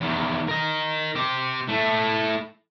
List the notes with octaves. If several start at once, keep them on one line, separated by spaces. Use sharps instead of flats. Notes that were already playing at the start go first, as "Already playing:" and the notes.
E2 D#3
A#4 D#5
C4 G4
A3 E4